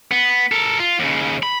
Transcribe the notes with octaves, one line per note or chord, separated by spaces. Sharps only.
B3
A4 A#4
F4
D#2 C#3
B5